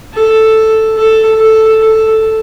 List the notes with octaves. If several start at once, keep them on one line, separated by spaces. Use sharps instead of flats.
A4
A4
A4
A4